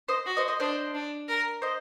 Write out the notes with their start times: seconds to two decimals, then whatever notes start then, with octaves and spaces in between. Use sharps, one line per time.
0.08 C5 D#5
0.26 F#4
0.37 C5 D#5
0.48 C5 D#5
0.60 D4 C5 D#5
0.94 D4
1.29 A#4
1.62 C5 D#5